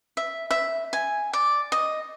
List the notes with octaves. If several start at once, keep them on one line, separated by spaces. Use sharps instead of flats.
E5
E5
G#5
D5
D#5